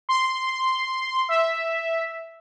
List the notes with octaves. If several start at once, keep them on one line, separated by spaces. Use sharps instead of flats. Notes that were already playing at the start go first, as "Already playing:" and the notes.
C6
E5